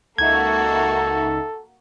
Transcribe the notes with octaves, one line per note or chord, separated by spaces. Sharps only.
C#2 A#3 D#4 F#4 A4 E5 G#6